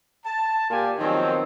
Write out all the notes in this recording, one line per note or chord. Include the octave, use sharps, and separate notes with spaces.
A5
A#2 F4 G4 D5 G#5
D#3 F3 F#3 B3 C4